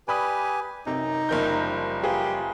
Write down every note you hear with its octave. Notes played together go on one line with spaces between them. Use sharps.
G4 B4 D5 G#5 B5 D#6
F#2 C3 D#4
F#1 F3 G3 A#4 G6
F4 G4 G#4 B4